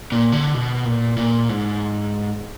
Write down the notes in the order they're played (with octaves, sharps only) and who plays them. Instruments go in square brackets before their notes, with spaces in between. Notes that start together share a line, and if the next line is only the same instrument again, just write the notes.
[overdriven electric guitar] A#2
D3
B2
A#2
A#2
G#2